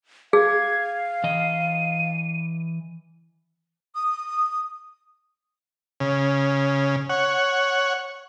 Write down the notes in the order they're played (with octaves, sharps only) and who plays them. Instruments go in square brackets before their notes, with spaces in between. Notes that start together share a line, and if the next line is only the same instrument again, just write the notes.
[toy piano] G#4 [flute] F5 [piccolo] G#6
[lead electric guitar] E3 D#5 [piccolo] D#7
[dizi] D#6
[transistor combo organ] C#3
C#5 F#5